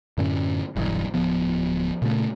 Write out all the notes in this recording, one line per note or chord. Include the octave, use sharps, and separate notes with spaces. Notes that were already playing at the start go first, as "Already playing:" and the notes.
F#2 A2 D3 C#4
E1 B1 G2 E3
D1 F3 B3
A#2 C#3 A3